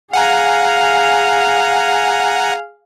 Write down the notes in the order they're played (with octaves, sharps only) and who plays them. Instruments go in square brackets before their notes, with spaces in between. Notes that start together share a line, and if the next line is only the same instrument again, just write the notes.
[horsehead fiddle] G#4 F5 [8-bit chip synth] F#5 G#5 A#5